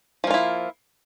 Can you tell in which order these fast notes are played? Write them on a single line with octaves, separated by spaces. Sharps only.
F3 A#3 F4 E4